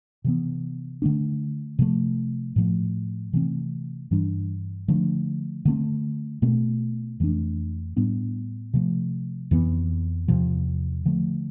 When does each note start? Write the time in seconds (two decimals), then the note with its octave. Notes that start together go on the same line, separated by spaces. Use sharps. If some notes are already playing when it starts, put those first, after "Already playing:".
0.24 C3 E3 B3
1.02 D3 A3 D4
1.79 C3 F3 A3
2.56 A2 F3 A3
3.33 C3 E3 A3 C4
4.11 G2 E3 G3 D4
4.88 D3 F3 A3 D4
5.65 D3 A3 C4
6.42 B2 A3 C4
7.20 F2 E3 A3 D4
7.97 A2 G3 B3 D4
8.74 C3 F3 A3
9.51 F2 E3 B3
10.28 E2 C3 F3
11.06 D3 F3 A3